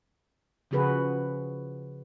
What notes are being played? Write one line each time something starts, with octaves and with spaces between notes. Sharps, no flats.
C#3 F3 F#4 G#4 B4